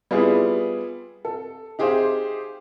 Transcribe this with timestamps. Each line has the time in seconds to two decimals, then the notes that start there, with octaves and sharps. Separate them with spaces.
0.11 G3 B3 E4 F4 G#4
1.25 A4
1.79 D#4 G4 G#4 C5 E5 F5